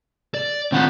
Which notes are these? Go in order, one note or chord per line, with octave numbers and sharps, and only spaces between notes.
D5
D#2 C4 F4 F#5